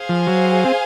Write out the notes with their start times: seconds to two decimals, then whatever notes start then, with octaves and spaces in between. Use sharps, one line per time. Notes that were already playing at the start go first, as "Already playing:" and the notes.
Already playing: G#4 C5 F5 G#5
0.09 F3
0.27 F#3
0.65 C4